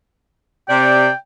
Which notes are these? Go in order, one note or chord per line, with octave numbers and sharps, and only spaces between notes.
C3 D5 G5